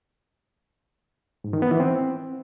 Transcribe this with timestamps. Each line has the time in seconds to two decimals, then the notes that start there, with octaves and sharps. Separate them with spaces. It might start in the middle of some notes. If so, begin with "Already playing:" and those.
1.44 G#2
1.53 D#3
1.62 B3
1.71 E3
1.80 C4